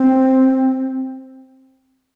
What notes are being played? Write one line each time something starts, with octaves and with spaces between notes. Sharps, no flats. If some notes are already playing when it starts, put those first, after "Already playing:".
Already playing: C4